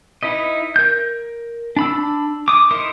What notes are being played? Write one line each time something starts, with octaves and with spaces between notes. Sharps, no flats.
D#4 E4 B4 D#5
A#4 G6
D4 B5 E6
D6 D#6
D#4 E4 A#4 C6 D#6